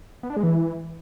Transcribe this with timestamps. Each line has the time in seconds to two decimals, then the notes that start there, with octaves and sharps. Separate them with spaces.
0.23 B3
0.30 D4
0.37 G#3
0.43 E3